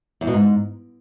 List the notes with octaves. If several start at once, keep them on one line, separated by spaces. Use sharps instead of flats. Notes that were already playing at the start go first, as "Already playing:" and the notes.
E2
B2
G#2